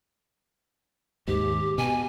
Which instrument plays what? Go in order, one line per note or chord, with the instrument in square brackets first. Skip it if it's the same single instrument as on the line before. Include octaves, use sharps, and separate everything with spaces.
[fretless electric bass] D#2 G#2 [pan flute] G4
[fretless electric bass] B2 [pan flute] G#5